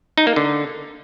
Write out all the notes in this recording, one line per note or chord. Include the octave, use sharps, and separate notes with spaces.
D#4
A#3
D3